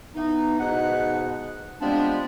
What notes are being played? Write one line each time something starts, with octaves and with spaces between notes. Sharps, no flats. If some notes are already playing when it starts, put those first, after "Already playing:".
E3 B3 D#4
G#2 B2 D#4 B4 F#5
F3 G3 G#3 B3 C4 D4